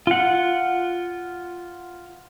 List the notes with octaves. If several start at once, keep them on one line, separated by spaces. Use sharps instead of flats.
F4 F#5